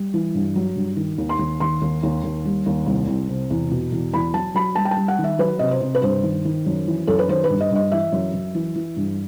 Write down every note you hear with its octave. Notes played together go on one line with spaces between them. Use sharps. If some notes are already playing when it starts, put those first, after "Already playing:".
Already playing: G3
E3
G2
F#3
G2
D#3
D#2
C6
D#2
D#3 C6
D#2
D#2
D#2
G3
D#2
C2
C2
C3
E2
B2
E2
E2 B5
F#3 A5
F#3 B5
G3 A5
G5
A5
G3
F#5
D#3
E5
F#3 B4
C3 D#5
C5
C3
B4
G2 C5
D#3
D#3
F#2
E3
F#2 A4
B4
D#3 C5
B4
G2
D#5
G2 D#5
E3 E5
F#2
F#2
E3
E3
G2